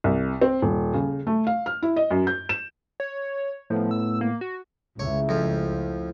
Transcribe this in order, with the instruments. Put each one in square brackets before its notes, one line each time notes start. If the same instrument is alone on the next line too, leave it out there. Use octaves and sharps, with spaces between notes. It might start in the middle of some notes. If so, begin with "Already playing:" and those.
[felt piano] C2
C4
D#1
C#3
A3
F5
F6
E4
D#5
F#2
G6
E7
[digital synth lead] C#5
[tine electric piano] A2 A3 B3 [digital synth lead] F3
[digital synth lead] E6
A#3
F#4
[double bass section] C#2 [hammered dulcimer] A2 E4 A#5 [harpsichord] C#5
[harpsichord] F2 F3